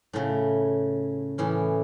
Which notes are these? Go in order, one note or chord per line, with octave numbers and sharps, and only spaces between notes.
A2 C#3
A2 E3 C#4